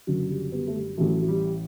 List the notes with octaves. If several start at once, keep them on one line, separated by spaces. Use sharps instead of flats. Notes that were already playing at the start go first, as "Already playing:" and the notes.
F#1 F#2 D3 F#3
G3
G3 B3
A3
G3
A1 A2 E3 F#3 A3
F#3
G3